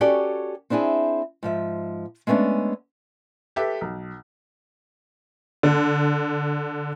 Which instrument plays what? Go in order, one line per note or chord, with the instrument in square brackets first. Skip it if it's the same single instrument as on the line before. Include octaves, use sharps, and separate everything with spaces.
[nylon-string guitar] C#4 F#4 G4 A4 D5
C4 D4 E4 G4 G#4
G#2 F3 E5
G#3 A3 B3 C#4 D4
[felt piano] G4 A4 B4 E5
B1
[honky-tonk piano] D3